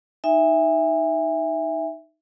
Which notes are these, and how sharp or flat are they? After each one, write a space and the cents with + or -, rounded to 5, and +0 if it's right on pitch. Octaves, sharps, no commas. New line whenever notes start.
D#4 +0 E5 +0 G#5 -30